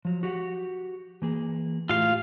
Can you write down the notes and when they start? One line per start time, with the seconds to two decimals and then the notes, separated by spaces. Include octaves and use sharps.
0.05 F3 F#3
0.23 F#4 G4 F#5
1.22 E3 A#3 G#4
1.89 A2 F4 G4 G#4 F5